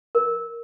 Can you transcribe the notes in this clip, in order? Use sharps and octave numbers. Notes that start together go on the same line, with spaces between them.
A#4